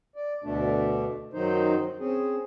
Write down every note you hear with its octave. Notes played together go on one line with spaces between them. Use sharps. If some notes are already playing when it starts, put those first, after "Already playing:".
D5
D2 B2 A3 D4
F#2 D#3 F#3 D#4 C5
C4 C#4 G#4